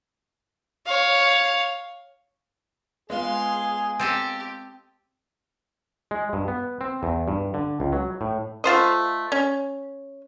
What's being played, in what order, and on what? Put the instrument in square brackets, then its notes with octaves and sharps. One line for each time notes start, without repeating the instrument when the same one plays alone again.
[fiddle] C#5 F5
[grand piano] G#3 B3 F4 [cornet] G#4 [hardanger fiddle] F5 C6
[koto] C4 A4 D#5 [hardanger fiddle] G4
[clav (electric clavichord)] G#3
G2
B3
C4
E2
G2
D3
C#2
F#3
A2
[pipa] A3 F4 C5 D#5
C#4